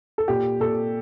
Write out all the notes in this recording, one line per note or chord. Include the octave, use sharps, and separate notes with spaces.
A4
A#2 G4
A#2 A4